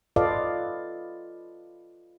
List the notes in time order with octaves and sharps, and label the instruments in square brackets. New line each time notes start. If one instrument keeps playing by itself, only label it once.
[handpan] F4 A4 B4 D5 D#5 F5